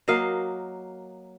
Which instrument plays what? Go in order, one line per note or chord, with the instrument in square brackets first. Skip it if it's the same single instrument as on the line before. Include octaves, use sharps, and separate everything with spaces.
[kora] F#3 A#3 D#5 F5